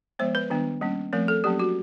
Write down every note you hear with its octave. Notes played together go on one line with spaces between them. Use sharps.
F3 G#3 B3 C5
B4
D#3 G3 B3 D4
G3 A#3 C#4
F3 A3 C4 A#4
A4
F#3 A#3 C#4 G4
F#4